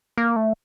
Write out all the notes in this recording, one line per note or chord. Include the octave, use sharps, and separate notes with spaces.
A#3
A3